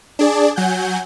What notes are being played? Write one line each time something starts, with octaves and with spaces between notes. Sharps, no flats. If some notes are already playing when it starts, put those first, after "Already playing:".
D4 G#4 D5
F#3 F#5 G#5 G6